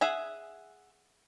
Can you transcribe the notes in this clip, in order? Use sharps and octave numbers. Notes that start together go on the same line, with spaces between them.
G#4 E5 F#5 G#5